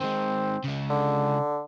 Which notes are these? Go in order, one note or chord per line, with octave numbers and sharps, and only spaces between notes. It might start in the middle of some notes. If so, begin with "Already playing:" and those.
D#3 G#3 C4
C#3 G#3
D3